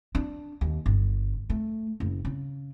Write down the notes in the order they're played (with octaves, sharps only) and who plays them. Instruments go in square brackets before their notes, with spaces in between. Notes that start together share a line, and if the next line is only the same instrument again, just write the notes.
[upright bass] D4
D#2
G1
A3
F#1
C#3